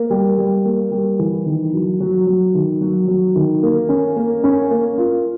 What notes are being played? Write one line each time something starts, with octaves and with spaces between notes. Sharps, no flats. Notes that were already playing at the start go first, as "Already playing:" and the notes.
Already playing: A#3
G3
G3
A#3
G3
E3
D#3
F#3
F#3
F#3
D#3
F#3
F#3
D#3
A#3
C#4
A#3
C#4
A#3
F4